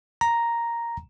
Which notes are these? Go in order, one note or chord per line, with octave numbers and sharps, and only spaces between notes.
A#5